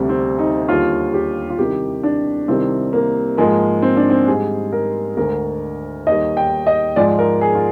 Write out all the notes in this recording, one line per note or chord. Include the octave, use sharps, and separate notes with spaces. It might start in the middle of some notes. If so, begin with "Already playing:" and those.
Already playing: D2 C3 G3
C4
D#4
D#2 D3 G3 F4
G4
F4
C2 C3 D#3 G4
D4
C2 C3 D#3 G3 C4
A#3
G#2 F3 G#3 A#3
C4
D4
C4
G#2 G3 G#4
A#4
D2 D3 G#3 A#4
D#2 D#3 G3 D#5
G5
D#5
G#2 F3 G#3 D5
A#4
G#4
F4